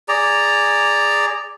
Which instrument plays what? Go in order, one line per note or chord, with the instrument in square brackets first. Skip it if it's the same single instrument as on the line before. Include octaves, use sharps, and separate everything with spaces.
[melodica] G#4 D5 A#5